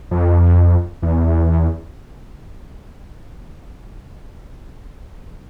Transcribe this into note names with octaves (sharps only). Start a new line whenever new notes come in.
F2
E2